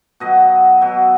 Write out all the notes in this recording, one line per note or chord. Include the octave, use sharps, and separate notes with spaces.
B2 F#3 D#5
B2 F#3